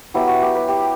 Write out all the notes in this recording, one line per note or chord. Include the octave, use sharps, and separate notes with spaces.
F#3 B3 E4 G4
F#4
G4
B4
G4